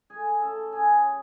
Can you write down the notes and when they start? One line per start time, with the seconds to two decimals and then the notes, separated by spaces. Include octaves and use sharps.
0.10 A3 G#4 G#5
0.41 C#3 A4 A5
0.72 C#3 G#4 G#5
1.04 F#3